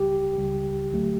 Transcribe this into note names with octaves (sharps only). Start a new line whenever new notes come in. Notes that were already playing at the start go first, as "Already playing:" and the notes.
Already playing: C#2 C#3 G3 G4
C#2 C#3 G3
D2 D3 F#3 A3